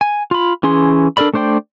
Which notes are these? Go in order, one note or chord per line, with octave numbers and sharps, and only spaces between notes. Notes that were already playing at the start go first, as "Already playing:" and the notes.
G#5
F4 B5
E3 C#4 G#4 C6
D4 A4 A#4 D5 B5
A3 D4 C5 D5 G5